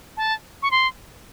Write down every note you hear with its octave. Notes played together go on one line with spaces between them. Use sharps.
A5
C#6
C6